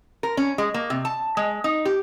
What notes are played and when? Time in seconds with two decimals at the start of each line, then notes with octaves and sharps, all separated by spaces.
0.23 A#4
0.37 C#4
0.58 G#3
0.74 A#3
0.90 C3
1.05 A5
1.37 G#3
1.64 D#4
1.85 G4